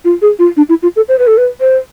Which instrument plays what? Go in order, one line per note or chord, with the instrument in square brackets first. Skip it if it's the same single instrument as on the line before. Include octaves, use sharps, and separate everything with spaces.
[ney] F4
G#4
F4
D4
E4
F4
A4
C5
B4
A4
B4
C5